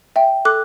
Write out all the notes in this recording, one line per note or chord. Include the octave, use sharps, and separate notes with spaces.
E5 G5
A4 D6 F#6